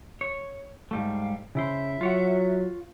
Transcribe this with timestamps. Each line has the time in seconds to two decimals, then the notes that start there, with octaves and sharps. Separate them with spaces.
0.21 C#5
0.91 G#2 G3 A3 F5
1.55 C#3 E4 C5 E5
2.01 F#3 F4 C#5 F#5